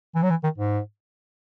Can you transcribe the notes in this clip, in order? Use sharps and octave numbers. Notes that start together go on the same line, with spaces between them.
E3
F#3
E3
D#3
G#2